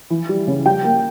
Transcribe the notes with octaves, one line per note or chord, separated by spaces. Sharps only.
E3
G3
C#3
G3 G5
A#3